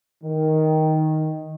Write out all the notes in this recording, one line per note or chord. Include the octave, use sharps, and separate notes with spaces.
D#3